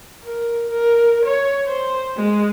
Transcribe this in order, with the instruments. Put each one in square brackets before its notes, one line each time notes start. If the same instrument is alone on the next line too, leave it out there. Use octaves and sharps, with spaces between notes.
[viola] A#4
A#4
C#5
C5
G#3